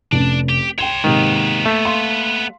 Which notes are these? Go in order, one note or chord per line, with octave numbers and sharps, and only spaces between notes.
F1 C#4 D4
G4
C#5 G5 C6 E7
G#2 C3 D#3 A#3 B3
A3
F5 C6